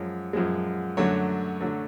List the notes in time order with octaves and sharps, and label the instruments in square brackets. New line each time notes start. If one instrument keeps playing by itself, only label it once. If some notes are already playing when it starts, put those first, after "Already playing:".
Already playing: [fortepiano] F#2 F3 G#3 C#5
F#2 F3 G#3
F#2 D3 F#3 A3 C#5
D3 F#3 A3